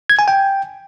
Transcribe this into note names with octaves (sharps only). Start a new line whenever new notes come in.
G#6
G#5
G5